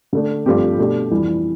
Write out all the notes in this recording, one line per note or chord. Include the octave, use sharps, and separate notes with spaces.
D3 A3 D4
G2 F3 A3 C4 G4
B2 A3 D4 G4
F2 E3 G3